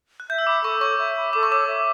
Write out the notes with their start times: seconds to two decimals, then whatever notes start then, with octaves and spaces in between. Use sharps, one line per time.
0.20 F#6
0.29 E5 G6
0.38 E6
0.46 B5 D6
0.63 A4 C#6
0.81 C#5 C#6
0.99 E5
1.17 B5
1.33 A4 D6
1.43 C#6
1.50 C#5 D6
1.68 E5